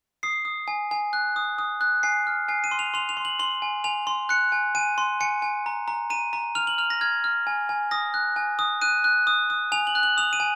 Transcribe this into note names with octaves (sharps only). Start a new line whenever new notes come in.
D#6 C7
D#6
G#5
G#5
F#6
D#6
D#6
F#6
G#5 C7
F6
G#5 C7
D#7
C6
F7
C6 F7
F7
C6
F#7
C6 F#7
G#5
G#5 F7
C6
F#6 C#7
G#5
G#5 D#7
C6
G#5 C#7
G#5
A#5
A#5
A#5 D#7
A#5
F6 F7
F#7
F6 F7
A#6
F6 G#6
F6
G#5
G#5
D#6 A#6
F#6
G#5
D#6
F#6 D#7
F#6
D#6
D#6
G#5 F7
F#7
F#6
F#7
D#6 F7
D#7
G#5